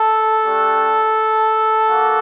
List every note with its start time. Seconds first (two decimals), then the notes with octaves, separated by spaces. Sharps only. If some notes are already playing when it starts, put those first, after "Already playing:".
Already playing: A4
0.45 A3 D4 G4
1.89 A#3 F#4